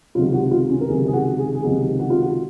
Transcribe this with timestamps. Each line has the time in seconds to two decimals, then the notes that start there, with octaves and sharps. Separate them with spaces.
0.15 C#2 C3 D#3 F#3 F4
0.33 F#4
0.51 F4
0.70 C#4
0.81 A#4
0.89 C#2 C3 D#3 F#3 G#4
1.06 G#4
1.13 F#4
1.39 G#4
1.55 G#4
1.63 C#2 C3 D#3 F#3 F#4
1.99 F#4
2.10 F4
2.21 F#4